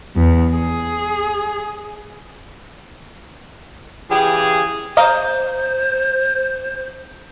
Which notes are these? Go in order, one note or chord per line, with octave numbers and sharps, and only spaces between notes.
E2
G#4
C#3 E3 G4 G#4
C5 D#5 F5 A#5